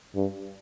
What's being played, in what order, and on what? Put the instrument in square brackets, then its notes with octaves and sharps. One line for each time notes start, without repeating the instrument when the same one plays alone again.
[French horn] G2